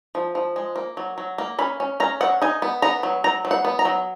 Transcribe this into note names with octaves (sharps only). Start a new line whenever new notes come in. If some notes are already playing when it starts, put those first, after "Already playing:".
F3
F3
G#3
A#3
F#3
F#3
A#3
C#4 B5
C#4
C#4 A#5
F#3 F#5
D#4 G#5
B3
B3 A#5
F#3
F#3 A#5
F#3
F#5
B3
A#5
F#3